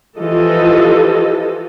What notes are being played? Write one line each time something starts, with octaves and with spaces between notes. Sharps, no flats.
E3 F3 F4 G4 A4 D#5